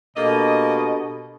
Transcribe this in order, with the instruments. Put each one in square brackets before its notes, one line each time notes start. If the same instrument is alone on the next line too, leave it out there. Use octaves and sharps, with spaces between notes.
[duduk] B2 [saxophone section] A#3 D#5 [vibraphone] D4 G4 A4